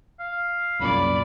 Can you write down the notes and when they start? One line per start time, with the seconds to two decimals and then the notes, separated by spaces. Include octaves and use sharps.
0.20 F5
0.80 C2 F#2 A#2 D5 B5